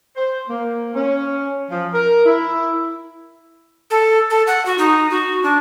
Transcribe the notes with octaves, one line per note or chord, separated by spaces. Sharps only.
C5
A#3
C#4
F3
A#4
E4
A4
A4
F#5
F#4
D#4
F#4
D4